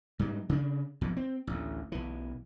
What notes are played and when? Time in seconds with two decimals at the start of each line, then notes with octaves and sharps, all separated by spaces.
0.19 G#2 F#3 G3
0.49 C#3 D4
1.01 B1 F2 A2
1.17 C4
1.47 A1 D2
1.92 B1 E3